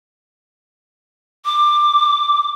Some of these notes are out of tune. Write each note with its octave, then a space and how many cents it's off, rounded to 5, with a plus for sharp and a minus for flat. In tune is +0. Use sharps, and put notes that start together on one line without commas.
D6 +15